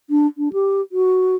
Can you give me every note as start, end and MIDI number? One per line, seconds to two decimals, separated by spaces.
0.10 0.27 62
0.38 0.52 62
0.53 0.81 67
0.92 1.36 66